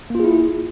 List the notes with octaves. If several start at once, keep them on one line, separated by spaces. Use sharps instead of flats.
A#3 E4 F4 G#4